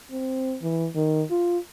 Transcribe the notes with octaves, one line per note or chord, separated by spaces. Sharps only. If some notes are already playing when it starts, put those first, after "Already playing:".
C4
E3
D#3
F4